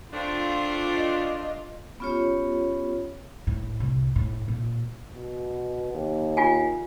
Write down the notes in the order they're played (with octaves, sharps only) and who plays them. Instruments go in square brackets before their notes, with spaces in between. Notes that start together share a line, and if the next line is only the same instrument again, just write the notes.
[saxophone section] A3 C4 D4 [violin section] F4
[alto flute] D#5
[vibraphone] B3 C#4 F4 G4 C#5
[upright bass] A2
C2
A2
A#2
[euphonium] B2
D#2
[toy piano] F4 F#5 G#5